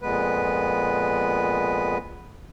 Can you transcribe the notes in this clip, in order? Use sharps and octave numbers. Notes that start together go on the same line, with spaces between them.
F2 A#2 G#3 B3 B4